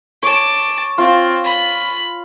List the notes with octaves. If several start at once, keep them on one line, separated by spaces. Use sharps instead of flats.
C#5 A5 D6
C4 F4
B5